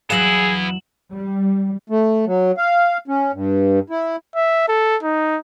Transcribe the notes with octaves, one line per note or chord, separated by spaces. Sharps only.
E2 F#3 B3 E4 G#4 F5 E7 F#7
G3
A3
F#3
F5
C#4
G2
E4
E5
A4
D#4